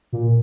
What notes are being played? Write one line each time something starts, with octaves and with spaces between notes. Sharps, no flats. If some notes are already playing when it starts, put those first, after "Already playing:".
A#2